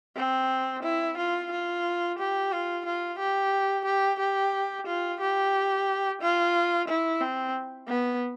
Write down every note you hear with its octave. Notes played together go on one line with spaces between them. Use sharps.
C4
E4
F4
F4
G4
F4
F4
G4
G4
G4
F4
G4
F4
E4
C4
B3